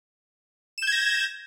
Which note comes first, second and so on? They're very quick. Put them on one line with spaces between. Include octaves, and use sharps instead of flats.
E7 G6 G#6 A#6